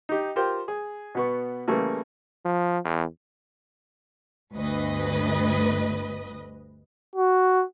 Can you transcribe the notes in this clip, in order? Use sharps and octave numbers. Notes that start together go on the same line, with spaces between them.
D#4 G4
F4 G4 A#4 C5 G5
G#4
B2 B3 C#6
C#3 E3 G3 A3 A#3
F3
E2
G1 D2 B4 D#5
F#4